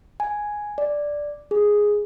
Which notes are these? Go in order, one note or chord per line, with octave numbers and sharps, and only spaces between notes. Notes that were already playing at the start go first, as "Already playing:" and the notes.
G#5
D5
G#4